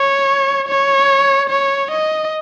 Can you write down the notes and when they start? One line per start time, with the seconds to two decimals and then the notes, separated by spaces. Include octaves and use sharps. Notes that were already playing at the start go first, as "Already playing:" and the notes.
Already playing: C#5
0.68 C#5
1.50 C#5
1.91 D#5